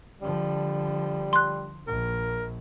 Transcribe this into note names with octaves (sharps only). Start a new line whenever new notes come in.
D3 F3 G3
C6 F#6
A#1 A#4